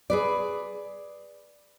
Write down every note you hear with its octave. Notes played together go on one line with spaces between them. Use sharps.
G#4 B4 D5